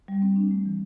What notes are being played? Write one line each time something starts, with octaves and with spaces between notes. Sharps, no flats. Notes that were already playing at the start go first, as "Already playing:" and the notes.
G3
C4
D4
A3
E3